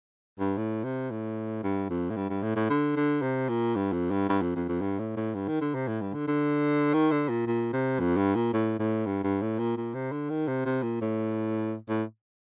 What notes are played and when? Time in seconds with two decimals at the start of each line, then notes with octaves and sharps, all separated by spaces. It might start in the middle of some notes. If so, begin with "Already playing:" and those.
0.40 G2
0.57 A2
0.84 C3
1.11 A2
1.63 G2
1.90 F2
2.10 A2
2.16 G2
2.29 G2
2.43 A2
2.56 A2
2.70 D3
2.96 D3
3.22 C3
3.49 A#2
3.76 G2
3.93 F2
4.11 G2
4.29 G2
4.42 F2
4.56 F2
4.69 F2
4.82 G2
4.99 A2
5.17 A2
5.35 G2
5.48 D#3
5.61 D3
5.75 C3
5.88 A2
6.01 G2
6.14 D3
6.28 D3
6.94 D#3
7.12 D3
7.29 A#2
7.47 A#2
7.73 C3
8.00 F2
8.17 G2
8.35 A#2
8.54 A2
8.79 A2
9.06 G2
9.24 G2
9.42 A2
9.59 A#2
9.77 A#2
9.94 C3
10.12 D3
10.30 D#3
10.48 C3
10.66 C3
10.83 A#2
11.01 A2
11.89 A2